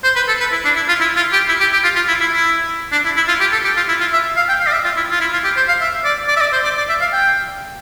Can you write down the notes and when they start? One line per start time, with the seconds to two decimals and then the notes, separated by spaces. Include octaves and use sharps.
0.04 C5
0.16 B4
0.28 A4
0.40 B4
0.52 E4
0.65 D4
0.76 E4
0.88 F4
1.01 E4
1.16 F4
1.33 G4
1.49 E4
1.60 G4
1.73 G4
1.84 F4
1.96 F4
2.08 E4
2.21 E4
2.33 E4
2.92 D4
3.05 E4
3.17 E4
3.28 F4
3.40 G4
3.52 A4
3.64 G4
3.77 F4
3.88 E4
4.00 F4
4.13 E5
4.37 F5
4.48 G5
4.60 F5
4.67 D5
4.72 E5
4.84 F4
4.97 E4
5.11 F4
5.21 E4
5.33 F4
5.44 G4
5.57 C5
5.68 F5
5.81 E5
6.04 D5
6.28 D5
6.36 E5
6.41 D5
6.53 C5
6.64 D5
6.77 D5
6.89 E5
7.01 F5
7.13 G5